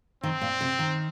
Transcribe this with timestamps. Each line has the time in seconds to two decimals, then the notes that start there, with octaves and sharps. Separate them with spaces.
0.23 D#3 C4
0.41 A#2
0.61 C3
0.79 D#3